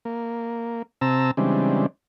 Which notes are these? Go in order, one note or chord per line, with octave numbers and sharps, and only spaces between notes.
A#3
C3 C4 A5 A#5 E6
C#3 E3 G3 G#3 C4 D4